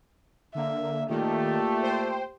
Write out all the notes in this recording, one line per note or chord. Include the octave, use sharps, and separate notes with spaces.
D3 A#3 E5
A#2 D#3 A3 G4
C5 G5